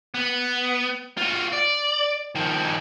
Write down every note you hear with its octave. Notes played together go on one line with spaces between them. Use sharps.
B3
F4 F#4
D5
D#3 F3